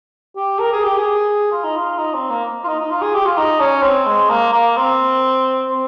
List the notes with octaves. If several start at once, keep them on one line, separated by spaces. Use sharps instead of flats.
G4
A#4
G#4
G4
G#4
F4
D#4
F4
D#4
C4
A#3
F4
D#4
D#4
F4
G#4
G4
F4
D#4
C#4
C4
G#3
A#3
A#3
C4
C4